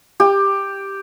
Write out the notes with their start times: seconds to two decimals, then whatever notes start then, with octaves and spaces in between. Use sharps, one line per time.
0.20 G4